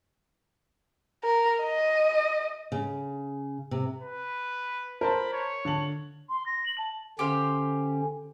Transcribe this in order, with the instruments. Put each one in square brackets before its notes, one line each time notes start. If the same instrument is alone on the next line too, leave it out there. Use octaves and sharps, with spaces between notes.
[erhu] A#4
D#5
[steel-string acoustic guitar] C#3
C3
[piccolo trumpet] B4
[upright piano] A#4 C5 A5 [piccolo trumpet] B5
[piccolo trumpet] C#5
[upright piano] D3 A5 F#7
[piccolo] C6
A#6
F#7
A5
[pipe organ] D3 C#4 [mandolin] G4 C5 F5